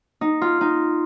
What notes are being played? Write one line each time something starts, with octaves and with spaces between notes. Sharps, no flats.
D#4
F4
D#4